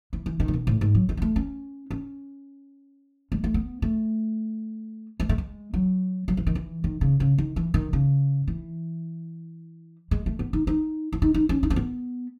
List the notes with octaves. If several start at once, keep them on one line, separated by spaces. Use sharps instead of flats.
E3
E3
D#3
A2
B2
A2
G#2
F#3
G#3
B3
A3
C#4
C#4
G#3
A3
B3
A3
G#3
A3
G#3
F#3
F#3
E3
D#3
E3
D#3
C#3
C#3
D#3
E3
D#3
C#3
E3
G#3
A3
B3
D#4
D#4
E4
D#4
D#4
C#4
D#4
C#4
B3